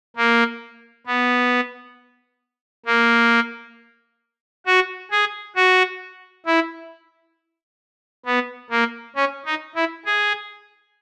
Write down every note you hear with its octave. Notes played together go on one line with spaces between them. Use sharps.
A#3
B3
A#3
F#4
G#4
F#4
E4
B3
A#3
C#4
D#4
E4
G#4